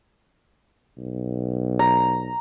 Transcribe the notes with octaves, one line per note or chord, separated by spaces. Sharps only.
B1
A#5